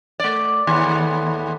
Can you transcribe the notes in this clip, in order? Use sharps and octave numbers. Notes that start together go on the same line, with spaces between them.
A3 D5
D#2 A2 B3